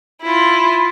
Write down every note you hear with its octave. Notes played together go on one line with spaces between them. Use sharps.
E4 F4